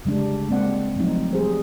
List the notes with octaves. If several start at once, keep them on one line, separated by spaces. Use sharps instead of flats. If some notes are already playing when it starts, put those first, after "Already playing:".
C#3 G3 G#3 D4
G#3 A#3 C4 D5 F#5
F3 F#3 A3 C4 D#4
G3 G#4 C5